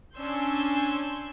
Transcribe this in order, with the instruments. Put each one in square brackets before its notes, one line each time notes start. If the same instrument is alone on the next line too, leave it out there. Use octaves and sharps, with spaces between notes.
[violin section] C#4 D4 C6 E6 G6 G#6